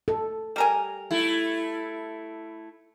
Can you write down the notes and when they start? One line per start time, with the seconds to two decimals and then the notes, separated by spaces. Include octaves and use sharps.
0.08 A4
0.56 G3 A#4 G#5
1.11 A3 E4